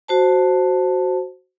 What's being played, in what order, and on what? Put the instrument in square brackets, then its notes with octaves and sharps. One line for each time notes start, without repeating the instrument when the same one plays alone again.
[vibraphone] F#4 C5 A5